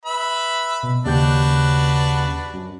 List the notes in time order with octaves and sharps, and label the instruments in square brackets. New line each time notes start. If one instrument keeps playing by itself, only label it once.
[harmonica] B4 E5 B5
[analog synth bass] B2
[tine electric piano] D#2 G4 G6 [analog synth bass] C#3 [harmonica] D4 F#4 B4
[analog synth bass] F#2